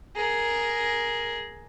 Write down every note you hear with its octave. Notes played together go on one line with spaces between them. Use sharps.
G#4 A#4